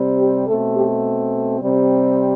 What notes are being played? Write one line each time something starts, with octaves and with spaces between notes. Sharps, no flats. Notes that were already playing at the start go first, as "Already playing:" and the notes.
Already playing: C3 G3 C4
G4
B2 A3 C4 A4
G4
C3 G3 C4